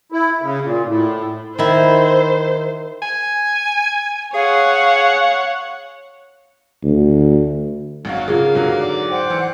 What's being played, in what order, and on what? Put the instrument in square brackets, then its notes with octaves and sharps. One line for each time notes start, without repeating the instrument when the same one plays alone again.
[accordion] E4
C#3
A#2
A2
[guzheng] D#3 E4 [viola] C5
[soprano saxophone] G#5
[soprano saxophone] G#4 [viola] C#5 F#5 [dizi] F5
[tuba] D2
[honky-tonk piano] G#1 F#2 F5 [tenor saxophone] F#3
[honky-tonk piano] C#3 [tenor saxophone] A#3 [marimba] F4 G#4
[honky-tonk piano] G#2 D3 F#3
[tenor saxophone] D5
[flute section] C5 F#5 G5
[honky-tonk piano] E3